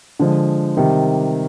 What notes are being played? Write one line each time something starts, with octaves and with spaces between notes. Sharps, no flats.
D3 F3 G#3
C3 D#3 G3